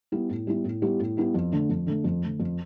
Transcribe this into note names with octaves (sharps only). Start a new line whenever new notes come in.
G3 B3 E4 G4
A2
G3 B3 E4 G4
A2
G3 B3 E4 G4
A2
G3 B3 E4 G4
F2
D3 A3
F2
D3 A3
F2
D3 A3
F2